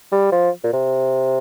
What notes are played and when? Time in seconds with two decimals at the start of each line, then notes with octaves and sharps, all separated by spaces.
0.12 G3
0.32 F3
0.64 A#2
0.73 C3